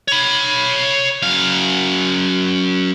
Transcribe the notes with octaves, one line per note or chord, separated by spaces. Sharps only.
C#5 B5
F#2 F5